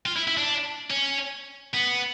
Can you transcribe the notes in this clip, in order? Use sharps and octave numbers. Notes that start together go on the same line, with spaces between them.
F4
E4
E4
D4
C#4
B3